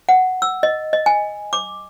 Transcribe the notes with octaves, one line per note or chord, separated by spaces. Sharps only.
F#5
E6
D#5
D#5
G#5
D6